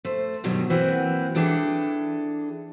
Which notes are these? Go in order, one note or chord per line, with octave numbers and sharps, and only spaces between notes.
A3 C5
G2 B2 D#3 F#3 G3
E3 A#3 C4 F#4 B4
E3 D4 G#4 A4 G5